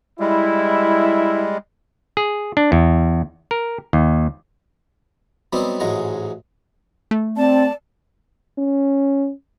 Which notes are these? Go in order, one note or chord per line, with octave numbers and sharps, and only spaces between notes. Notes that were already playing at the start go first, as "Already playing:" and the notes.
G3 G#3 E4
G#4
D4
E2
A#4
D#2
F#3 G3 B3 C4 D#4 G4
A1 G#2 F#3 G#3 A#5
A3
C4 D5 A5
C#4